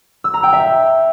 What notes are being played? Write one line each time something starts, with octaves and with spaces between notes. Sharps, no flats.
E6
A#5
G5
E5